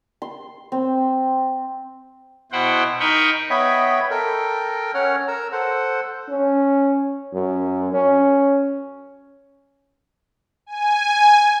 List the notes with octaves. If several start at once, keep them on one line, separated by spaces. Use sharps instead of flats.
C6
C4
B2 E4 C5 F#5 G5
D#4 A#4 D#5 G5 B5 C#6
B3 C#5 D#5 E5 G5 B5
A4 A#4 G5
C#4 C#5 F#5 F6
A#4 A#5 E6
A4 C5 F#5
C#4
F#2
C#4
G#5